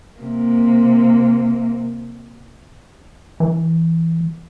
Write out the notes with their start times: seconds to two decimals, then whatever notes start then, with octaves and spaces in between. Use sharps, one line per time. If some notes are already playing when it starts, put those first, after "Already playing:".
0.20 C3 A#3
3.40 E3